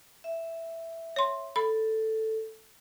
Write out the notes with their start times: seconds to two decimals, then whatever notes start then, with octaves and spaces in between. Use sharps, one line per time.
0.24 E5
1.16 C#5 C6
1.56 A4 B5